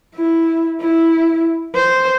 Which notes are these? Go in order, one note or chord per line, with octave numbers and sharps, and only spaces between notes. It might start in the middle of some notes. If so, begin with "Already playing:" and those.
E4
E4
C5